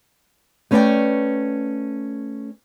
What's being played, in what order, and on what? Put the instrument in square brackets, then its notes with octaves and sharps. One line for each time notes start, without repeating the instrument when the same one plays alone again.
[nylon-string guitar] A3 C#4 B4 C5 D5 G5